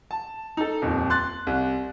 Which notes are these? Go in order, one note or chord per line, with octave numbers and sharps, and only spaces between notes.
A5
D#4 A4
D#1 F2
C6 F#6 A6
C2